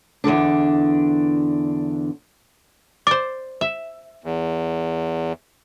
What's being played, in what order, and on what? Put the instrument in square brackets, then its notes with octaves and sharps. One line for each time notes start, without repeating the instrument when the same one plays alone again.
[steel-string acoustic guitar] E2 G2 D3 D4
[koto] C5 D5 [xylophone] D6
[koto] E5
[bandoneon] E2